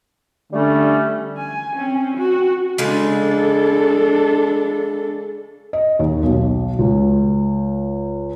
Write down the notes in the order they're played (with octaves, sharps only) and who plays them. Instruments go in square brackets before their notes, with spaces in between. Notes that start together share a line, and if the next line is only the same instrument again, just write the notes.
[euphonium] D3 [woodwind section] G3 A3 C#4
[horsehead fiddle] G#5
C4 C#4
F#4
[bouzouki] C#3 G#3 [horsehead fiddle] D4 A4
[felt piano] D#5
D#2
B1
C#2